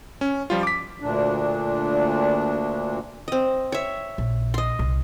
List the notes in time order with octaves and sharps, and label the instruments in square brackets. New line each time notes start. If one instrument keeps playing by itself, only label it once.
[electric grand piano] C#4
F3 G3 F4
D6 B6
[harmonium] D2 A#2 D4
[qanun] C4 D#5
C#5 E5
[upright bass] A#1
[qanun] D#5 C6
[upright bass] C2